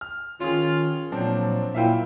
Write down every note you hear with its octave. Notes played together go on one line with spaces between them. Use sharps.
F6
D#3 C#4 F4 G#4
A#2 F3 F#3 C4 D4
A#2 E4 E5 F5 G5